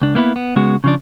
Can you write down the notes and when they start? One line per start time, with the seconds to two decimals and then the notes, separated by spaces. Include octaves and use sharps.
0.02 C#2 D4
0.15 A#3 B3 E4 B4
0.36 B3
0.56 C#3 G#3 B3 F#4
0.84 C#3 F3 D4